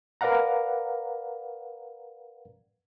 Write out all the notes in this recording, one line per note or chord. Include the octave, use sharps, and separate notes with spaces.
A#4 B4 D5 F5 F#5 A#5